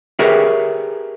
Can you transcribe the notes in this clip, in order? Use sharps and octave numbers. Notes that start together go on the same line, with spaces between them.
G4 G#4 A#4 B4 C#5 E5